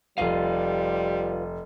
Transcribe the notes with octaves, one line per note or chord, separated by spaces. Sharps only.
F1 G3 F4 B4 F5 D#7